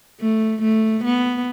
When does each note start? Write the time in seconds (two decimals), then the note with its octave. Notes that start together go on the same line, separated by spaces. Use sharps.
0.20 A3
0.62 A3
1.05 B3